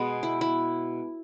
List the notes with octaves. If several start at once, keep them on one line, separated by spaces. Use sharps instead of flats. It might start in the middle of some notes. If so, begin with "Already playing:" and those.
Already playing: B2 G#3 B3 G#4
E4
E4